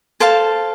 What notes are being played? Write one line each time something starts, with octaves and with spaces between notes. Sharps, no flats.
A4 C5 F5 A5